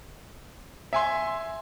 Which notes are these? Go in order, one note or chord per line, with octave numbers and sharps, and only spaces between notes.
E5 G#5 C6